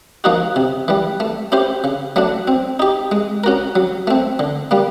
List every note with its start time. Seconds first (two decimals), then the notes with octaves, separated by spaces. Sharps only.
0.24 F3 A#3 D#4 F#4
0.56 C3
0.88 E3 G3
1.20 A3
1.52 C#4 E4 G4 C5
1.84 C#3
2.16 F#3 A3 D4
2.48 C4
2.80 D#4 G4
3.12 G#3
3.44 C#4 F#4 A#4
3.76 F#3
4.07 A3 C4
4.39 D3
4.71 G3 A#3